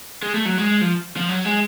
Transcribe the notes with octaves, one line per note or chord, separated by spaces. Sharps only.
G#3
A3
F#3
G#3
F3
F3
F#3
G#3